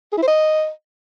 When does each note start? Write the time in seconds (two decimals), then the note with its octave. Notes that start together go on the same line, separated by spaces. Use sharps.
0.13 G#4
0.18 E4
0.23 C5
0.28 D#5